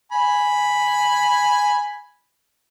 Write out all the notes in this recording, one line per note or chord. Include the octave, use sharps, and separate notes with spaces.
G#5 B5